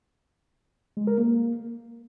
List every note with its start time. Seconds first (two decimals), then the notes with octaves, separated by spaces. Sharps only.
0.97 G#3
1.07 A#4
1.18 A#3